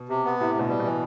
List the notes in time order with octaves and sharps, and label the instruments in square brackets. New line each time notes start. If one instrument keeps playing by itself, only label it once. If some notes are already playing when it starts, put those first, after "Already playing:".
Already playing: [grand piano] B2
[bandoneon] C3
B3
[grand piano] A2 [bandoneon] C3
[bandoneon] D2 [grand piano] B2
[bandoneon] G3
[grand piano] B2 [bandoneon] E3